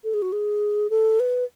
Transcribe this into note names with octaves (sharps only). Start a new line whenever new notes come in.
A4
G#4
F#4
G#4
A4
B4